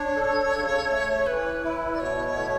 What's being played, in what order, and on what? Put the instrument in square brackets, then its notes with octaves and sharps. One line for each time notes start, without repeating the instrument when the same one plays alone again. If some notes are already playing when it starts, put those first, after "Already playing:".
Already playing: [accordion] D4 [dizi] C#5
[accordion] A4
C#3
A3
[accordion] E3 [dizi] B4
[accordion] E4
[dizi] D5
[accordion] B2 [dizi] C#5
[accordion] A3